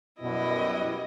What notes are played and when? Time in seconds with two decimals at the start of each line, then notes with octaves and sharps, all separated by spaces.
0.21 F#2 B2 G3 B3 E4 F#4 D#5